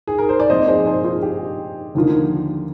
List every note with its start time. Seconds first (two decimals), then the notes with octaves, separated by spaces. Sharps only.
0.07 G#4
0.18 A#4
0.29 C5
0.40 D5
0.50 A#2 F3 C4 C5 D#5
0.68 G#4 C5
0.87 G#4 C5
1.04 F4 G#4
1.22 G4
1.95 D#2 D3 F3 A#3 F4